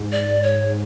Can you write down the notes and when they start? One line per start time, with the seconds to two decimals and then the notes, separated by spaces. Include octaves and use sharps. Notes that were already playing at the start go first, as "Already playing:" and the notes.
Already playing: G#2
0.12 D5
0.44 C#5